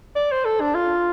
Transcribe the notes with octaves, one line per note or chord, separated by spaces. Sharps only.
D5
C5
A4
D4
F4